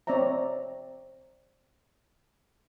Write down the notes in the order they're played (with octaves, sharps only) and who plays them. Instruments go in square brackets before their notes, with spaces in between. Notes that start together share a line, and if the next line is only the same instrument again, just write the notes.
[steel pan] C4 C#5 D5 E5 A#5